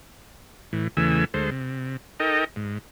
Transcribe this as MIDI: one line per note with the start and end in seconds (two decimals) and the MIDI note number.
0.73 0.88 45
0.73 0.88 52
0.97 1.25 40
0.97 1.25 49
0.97 1.25 52
0.97 1.25 57
0.97 1.25 80
0.97 1.25 88
1.34 1.50 38
1.34 1.50 56
1.34 1.50 69
1.34 1.50 72
1.51 1.97 48
2.20 2.44 63
2.20 2.44 69
2.20 2.44 70
2.20 2.44 75
2.20 2.44 79
2.56 2.78 44